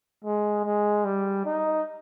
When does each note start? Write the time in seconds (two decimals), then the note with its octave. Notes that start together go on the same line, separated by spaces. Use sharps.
0.24 G#3
0.65 G#3
1.05 G3
1.46 D#4